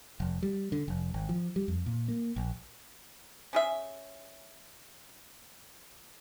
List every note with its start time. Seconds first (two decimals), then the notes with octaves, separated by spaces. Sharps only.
0.20 F1
0.43 G3
0.72 D3
0.88 F1
1.14 G#1
1.29 F3
1.56 G3
1.68 F2
1.86 A#2
2.08 A#3
2.36 A#1
3.53 C#4 G#4 E5